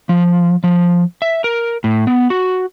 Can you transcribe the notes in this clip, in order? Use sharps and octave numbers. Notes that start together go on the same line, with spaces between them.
F3
F3
E5
A#4
A2
B3
F#4